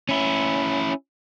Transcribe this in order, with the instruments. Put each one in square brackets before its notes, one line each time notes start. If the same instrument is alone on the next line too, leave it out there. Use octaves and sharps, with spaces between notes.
[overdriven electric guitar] C#4 E4